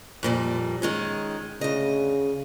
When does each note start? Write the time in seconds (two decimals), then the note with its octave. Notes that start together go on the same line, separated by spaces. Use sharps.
0.23 F2 A#2 G3
0.82 D#3 G#3 C#4
1.61 D2 C#3 D#5